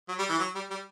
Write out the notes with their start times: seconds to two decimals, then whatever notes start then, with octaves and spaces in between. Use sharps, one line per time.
0.09 F#3
0.19 G3
0.29 E3
0.39 F#3
0.55 G3
0.70 G3